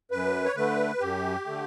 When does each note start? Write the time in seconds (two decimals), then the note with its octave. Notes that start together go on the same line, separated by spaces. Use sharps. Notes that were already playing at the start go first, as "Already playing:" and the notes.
0.11 F#2 B4
0.45 C#5
0.56 D3 A3 B4
1.00 F#2 G4
1.45 D3 A3